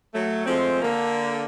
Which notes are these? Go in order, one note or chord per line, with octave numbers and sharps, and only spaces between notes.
F#3 A3
F3 G#3 A3 C4
D3 A#3